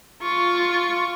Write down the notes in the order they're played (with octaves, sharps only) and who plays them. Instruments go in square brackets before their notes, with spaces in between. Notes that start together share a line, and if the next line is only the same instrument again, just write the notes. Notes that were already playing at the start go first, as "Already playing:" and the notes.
[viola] F4 C#6